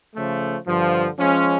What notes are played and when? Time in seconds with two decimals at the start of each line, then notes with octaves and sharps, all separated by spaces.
0.15 C#3 F3 A3
0.67 G2 D3 F3
1.19 F3 G#3 C#4